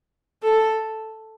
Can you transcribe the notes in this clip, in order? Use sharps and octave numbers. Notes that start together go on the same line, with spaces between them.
A4